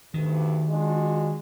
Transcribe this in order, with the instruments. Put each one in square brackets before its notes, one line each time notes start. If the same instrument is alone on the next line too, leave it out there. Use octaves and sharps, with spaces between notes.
[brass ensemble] D2 G2 [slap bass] D#3
[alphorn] G#3 [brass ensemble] D4 F4 F#4